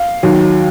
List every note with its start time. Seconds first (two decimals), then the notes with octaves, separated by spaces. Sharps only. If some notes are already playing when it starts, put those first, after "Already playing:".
Already playing: F5
0.23 D#2 D#3 F#3